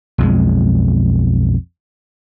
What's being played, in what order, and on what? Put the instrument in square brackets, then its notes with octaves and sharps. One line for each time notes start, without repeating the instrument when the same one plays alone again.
[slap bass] B1 F2 G#3